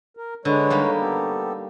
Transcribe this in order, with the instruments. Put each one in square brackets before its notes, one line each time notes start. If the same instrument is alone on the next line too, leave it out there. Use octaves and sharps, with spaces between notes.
[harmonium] A#4
[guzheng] D3 [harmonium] G#3 B4 C#5
[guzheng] G3 A#3 D#4
[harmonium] B3 G4 A4